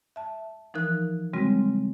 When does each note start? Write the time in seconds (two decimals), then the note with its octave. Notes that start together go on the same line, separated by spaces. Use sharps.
0.16 E5 A5
0.74 E3 F3 D#4 A#4 F#6
1.33 C#3 G3 G#3 C4 F#4